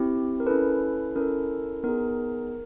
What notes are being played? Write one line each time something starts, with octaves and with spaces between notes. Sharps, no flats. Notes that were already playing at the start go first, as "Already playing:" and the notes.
Already playing: C4 E4 G4
A#4
C#4 E4 A4 B4
C#4 E4 A4 A#4
B3 D#4 G#4 A#4